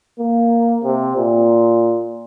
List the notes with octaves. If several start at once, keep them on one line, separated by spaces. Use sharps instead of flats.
A#3
C3
A#2